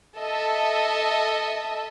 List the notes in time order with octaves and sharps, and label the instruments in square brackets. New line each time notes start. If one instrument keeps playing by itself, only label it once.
[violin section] A4 D#5 E5